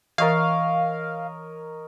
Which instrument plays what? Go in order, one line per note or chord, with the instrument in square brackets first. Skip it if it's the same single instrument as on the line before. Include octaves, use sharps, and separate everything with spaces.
[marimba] E3 A6 [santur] A#4 C#5 D#5 [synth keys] F5